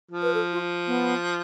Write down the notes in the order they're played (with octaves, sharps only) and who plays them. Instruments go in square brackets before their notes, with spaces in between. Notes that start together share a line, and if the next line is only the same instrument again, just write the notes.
[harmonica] F3
[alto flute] B4
A4
F4
B3